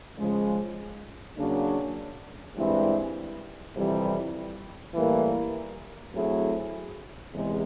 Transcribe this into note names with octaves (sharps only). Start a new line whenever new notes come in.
C#3 F3 G#3
C#3 F#3 A#3 D4
G2 E3 G#3 C4 E4
F2 C3 E3 G3
A2 E3 G3 A#3
F#3 A3 C4 E4 G#4
E2 C3 E3 G#3